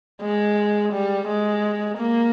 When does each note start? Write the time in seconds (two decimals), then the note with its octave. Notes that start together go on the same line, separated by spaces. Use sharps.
0.22 G#3
0.93 G3
1.28 G#3
1.98 A#3